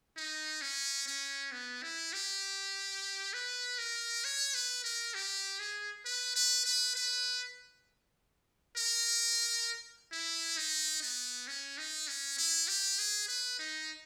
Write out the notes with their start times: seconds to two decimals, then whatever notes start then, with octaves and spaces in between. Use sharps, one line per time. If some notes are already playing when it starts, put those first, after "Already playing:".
0.17 D#4
0.62 C#4
1.08 C#4
1.52 B3
1.83 E4
2.13 G4
3.33 B4
3.78 A#4
4.25 C#5
4.55 B4
4.84 A#4
5.14 G4
5.59 G#4
6.05 B4
6.36 B4
6.65 B4
6.96 B4
8.77 A#4
10.12 E4
10.57 D#4
11.02 B3
11.48 C#4
11.78 D#4
12.08 C#4
12.38 E4
12.68 G4
12.99 G#4
13.28 B4
13.59 D#4